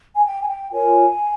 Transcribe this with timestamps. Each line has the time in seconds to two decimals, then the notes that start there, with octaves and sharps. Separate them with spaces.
0.15 G#5
0.25 G5
0.42 G#5
0.48 G5
0.72 F4 A#4 C#5 G#5